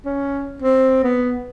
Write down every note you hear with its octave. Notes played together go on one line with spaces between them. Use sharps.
C#4
C4
B3